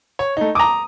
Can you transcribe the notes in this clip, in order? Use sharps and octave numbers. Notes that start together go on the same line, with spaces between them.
C#5
A3 D#4
A#5 D6 D#6